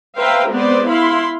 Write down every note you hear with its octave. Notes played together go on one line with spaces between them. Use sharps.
B4 C5 E5 F5 G5 A#5
G#3 B3 C4 B4 C5 D5
E4 F5 B5 C6